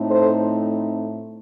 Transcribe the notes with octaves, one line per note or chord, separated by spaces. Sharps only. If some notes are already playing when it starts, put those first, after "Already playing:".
Already playing: A2 A3 C4 D#4
A4 C5